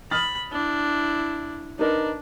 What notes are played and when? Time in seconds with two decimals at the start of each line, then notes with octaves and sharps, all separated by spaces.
0.11 B5 D#6 F6 A6
0.51 D4 E4
1.79 D4 D#4 A#4 B4